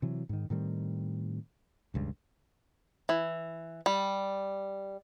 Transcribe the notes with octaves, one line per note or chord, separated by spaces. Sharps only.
C3 E3 F#3
G#2 D#3
A2 D#3 G3 C4
E1 C#2 G2
E3
G3